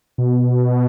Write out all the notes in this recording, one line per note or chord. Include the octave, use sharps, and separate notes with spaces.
B2